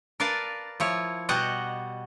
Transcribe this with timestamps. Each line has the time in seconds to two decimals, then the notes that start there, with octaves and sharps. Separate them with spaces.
0.20 A#4 B4 D5 F5 A5
0.80 F3 E4 C#5
1.29 B2 G3 F#4 D#5 F#5